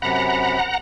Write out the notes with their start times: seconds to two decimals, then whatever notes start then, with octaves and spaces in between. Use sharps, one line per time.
0.02 F#2 C3 F#5 A#5 B5